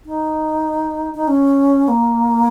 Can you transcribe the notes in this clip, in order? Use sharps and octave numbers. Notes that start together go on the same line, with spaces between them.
D#4
D#4
C#4
A#3